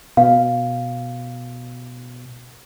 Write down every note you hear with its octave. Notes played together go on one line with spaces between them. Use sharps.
B2 F5